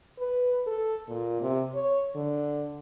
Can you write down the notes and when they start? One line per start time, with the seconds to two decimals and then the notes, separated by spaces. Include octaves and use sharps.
0.19 B4
0.67 A4
1.08 A#2
1.41 C3
1.74 C#5
2.16 D3